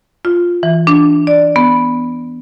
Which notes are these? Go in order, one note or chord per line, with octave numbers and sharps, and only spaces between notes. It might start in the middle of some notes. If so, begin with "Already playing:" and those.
F4
E3
D4
D5
B3